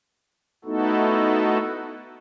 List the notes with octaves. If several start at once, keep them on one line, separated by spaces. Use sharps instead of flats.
A3 B3 D#4 E4 F#4 A4